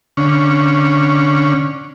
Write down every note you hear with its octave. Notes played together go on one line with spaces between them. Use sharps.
D3 C#4